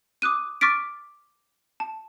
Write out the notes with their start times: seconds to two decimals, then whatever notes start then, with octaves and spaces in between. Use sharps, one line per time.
0.22 D6 D#6 F#6 D#7
0.61 C#6 D6 F6 A6 B6 D7
1.80 A5